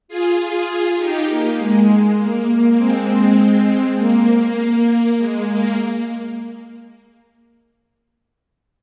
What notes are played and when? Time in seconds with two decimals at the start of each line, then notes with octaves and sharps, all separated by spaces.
0.08 F4 G#4
0.38 F4 G#4
0.98 D#4 G4
1.28 A#3
1.58 G#3
2.18 A#3
2.48 A#3
2.77 G#3 C4
3.97 A#3
5.17 G#3
5.47 A#3